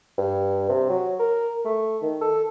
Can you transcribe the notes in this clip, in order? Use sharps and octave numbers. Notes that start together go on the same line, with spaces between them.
G2
C3
F#3
A#4
A3
D#3
A4